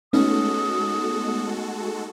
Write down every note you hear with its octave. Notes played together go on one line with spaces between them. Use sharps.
G#3 A3 B3 C#4 D#4 F#4 A4 D#6